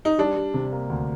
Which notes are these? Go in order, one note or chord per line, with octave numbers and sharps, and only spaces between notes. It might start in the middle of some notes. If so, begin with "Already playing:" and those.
D#4
G3 D4
G3
C3
A#3
D2